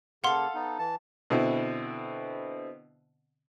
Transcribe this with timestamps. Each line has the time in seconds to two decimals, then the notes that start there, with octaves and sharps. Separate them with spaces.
0.24 C#3 A#3 A4 F5 F#5 C6
0.54 B3 D#4
0.79 E3 A5
1.30 B2 D3 C4 E4